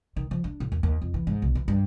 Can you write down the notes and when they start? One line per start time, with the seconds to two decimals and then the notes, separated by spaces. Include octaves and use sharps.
0.16 D#3
0.31 F3
0.44 D4
0.60 A2
0.72 D#2
0.83 D#2
1.02 F2
1.14 E3
1.27 G#2
1.42 B1
1.55 E3
1.68 G2